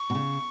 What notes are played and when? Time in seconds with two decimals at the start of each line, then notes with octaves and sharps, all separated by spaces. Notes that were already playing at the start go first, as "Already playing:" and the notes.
Already playing: C#6
0.10 B2
0.15 C#3